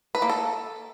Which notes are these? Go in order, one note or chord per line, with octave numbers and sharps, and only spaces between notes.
B4
A#3
A4